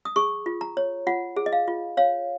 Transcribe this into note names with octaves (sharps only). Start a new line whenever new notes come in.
D#6
G#4 C#6
F4
A#5
C#5
F4 F#5
G#4
D#5
F5
F4
C#5 F5